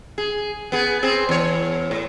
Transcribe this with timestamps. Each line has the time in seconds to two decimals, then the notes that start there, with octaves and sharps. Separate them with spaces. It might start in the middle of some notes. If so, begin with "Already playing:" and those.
0.18 G#4
0.72 B3 G#4
1.03 C4 G#4
1.29 E2 C#5
1.91 A2